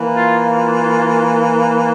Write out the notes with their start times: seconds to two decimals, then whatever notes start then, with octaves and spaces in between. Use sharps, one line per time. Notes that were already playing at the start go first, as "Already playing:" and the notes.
Already playing: E3 A#3
0.14 F4
0.46 F4